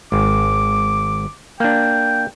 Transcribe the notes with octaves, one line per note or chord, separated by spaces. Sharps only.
G#1 D6
A#3 D4 G5